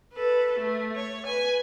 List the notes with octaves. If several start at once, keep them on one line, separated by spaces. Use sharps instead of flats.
A4 B4
A3
C#5
B4 G#5